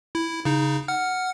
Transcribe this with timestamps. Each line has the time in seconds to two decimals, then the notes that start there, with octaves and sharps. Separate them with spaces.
0.15 E4
0.45 C#3 D#4
0.88 F#5 F6